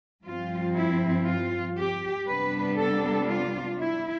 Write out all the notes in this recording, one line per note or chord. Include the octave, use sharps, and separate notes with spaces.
G2 F3 C4 F4
E4
F4
G4
C3 G3 B3 D4 B4
A4
F4
E4